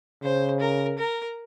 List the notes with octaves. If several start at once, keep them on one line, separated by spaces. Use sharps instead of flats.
C#3 C5
A#4
A#4